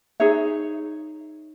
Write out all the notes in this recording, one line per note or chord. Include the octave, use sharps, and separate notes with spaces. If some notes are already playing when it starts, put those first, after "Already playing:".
D#4 G#4 C#5 E5